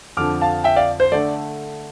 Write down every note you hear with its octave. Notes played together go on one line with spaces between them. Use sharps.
F2 D3 F3 D6 F6
F5 A5
E5 G5
D5 F5
C5
D3 A3 D5